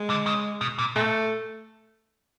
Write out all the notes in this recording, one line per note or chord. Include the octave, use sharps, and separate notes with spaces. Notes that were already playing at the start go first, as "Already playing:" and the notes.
Already playing: G#3
D3
C#3
B2
A#2
A#2 A3